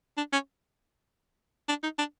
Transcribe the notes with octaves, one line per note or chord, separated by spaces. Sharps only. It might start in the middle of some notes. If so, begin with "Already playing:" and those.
D4
C#4
D4
D#4
D4